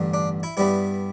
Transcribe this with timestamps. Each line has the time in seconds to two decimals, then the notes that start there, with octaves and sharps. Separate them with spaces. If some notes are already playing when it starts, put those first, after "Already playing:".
Already playing: A1 G2 D3
0.14 D4
0.43 E4
0.57 G2 G3 B3 E4